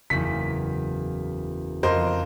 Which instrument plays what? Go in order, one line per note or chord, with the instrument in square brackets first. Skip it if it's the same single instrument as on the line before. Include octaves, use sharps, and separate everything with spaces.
[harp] F#1 E2 [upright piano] B6
[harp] F2 [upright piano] A#4 C5 D#5